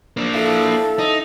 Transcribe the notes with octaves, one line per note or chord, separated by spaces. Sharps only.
A#3 D4
E4 A4 E5 F5
D#4